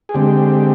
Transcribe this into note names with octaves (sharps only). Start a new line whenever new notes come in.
G#4
D3 G#3 C4 G4